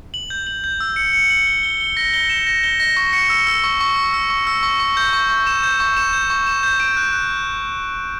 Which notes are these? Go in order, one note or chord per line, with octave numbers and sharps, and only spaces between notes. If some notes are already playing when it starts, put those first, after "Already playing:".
F#7
G6
F#7
G6
E6
C#7
C#7
F#7
G7
G7
G7
A#6
G7
E7
A#6
G7
A#6
C#6
C#7
E6
E6
C#6
C#6
E6
E6
C#6
E6
C#6
C#6
G6
C#6
C#6
E7
G6
C#6
E7
G6
C#6
E7
G6
D7
F#6
F#6